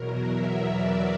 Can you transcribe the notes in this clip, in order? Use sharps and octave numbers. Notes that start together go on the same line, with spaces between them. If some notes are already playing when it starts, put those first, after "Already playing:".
Already playing: E2 B2 F#3 A#4
E5
D5